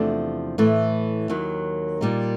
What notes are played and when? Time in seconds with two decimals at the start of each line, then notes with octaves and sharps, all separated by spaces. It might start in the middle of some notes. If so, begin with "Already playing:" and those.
Already playing: E2 C3 F3 A3 D4
0.58 A2 E3 A3
1.29 D#2 D#3 F#3
2.01 A#2 G3 A#3 D#4